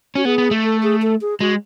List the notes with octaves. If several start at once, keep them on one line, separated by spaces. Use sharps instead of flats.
C#4 F#4
B3 G#4
B3
A3
A4
G#4
A4
G#4
G#3 F#4